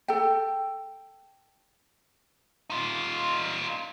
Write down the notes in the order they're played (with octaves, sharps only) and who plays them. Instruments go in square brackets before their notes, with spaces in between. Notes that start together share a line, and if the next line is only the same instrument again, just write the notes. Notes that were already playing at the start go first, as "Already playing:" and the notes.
[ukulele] A4 G5
[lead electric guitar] D#4 F4